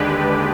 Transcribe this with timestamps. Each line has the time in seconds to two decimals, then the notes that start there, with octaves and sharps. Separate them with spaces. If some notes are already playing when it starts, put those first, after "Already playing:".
Already playing: D#2 D3 G#3 D4 G4 B4